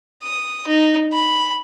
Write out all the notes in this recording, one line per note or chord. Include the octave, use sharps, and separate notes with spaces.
D#6
D#4
B5